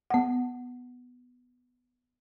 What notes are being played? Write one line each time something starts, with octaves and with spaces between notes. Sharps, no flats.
B3 F#5